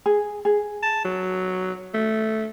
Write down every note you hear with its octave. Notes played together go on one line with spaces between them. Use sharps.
G#4
G#4
A5
F#3
A3